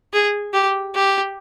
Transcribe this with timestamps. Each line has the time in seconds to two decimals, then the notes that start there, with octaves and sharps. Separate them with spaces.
0.13 G#4
0.53 G4
0.95 G4